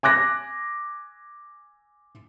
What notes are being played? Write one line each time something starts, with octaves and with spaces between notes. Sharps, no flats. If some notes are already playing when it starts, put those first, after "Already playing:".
G#5 D6 F#6 A#6